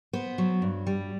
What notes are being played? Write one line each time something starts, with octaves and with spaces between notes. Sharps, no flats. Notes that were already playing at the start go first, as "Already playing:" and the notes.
B3 C5
F#3
G2
G3